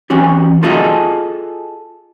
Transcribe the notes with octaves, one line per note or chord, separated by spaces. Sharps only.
E3 C#4 F#4 G4
F4 F#4 G#4 A4 D#5 E5